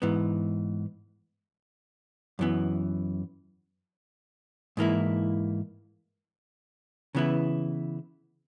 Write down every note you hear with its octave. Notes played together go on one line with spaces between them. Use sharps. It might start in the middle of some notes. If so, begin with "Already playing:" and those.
G#2 E3 B3
F#2 E3 B3
G#2 E3 A#3 E4
C#3 E3 B3 E4